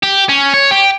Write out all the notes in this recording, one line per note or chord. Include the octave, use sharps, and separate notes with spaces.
G4
C#4
C#5
G4